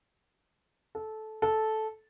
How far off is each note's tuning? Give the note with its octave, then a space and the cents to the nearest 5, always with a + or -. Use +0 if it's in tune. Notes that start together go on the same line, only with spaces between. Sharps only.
A4 -15
A4 -10